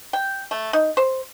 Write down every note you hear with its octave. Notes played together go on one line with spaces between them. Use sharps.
G5
A3
D#4
C5